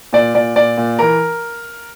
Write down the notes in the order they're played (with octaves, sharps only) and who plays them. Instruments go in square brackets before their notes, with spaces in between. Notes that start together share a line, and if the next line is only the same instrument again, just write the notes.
[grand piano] A#2 D5
A#2 D5
A#2 D5
A#2
E3 A#4